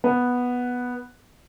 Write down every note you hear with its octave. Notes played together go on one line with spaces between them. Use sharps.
B3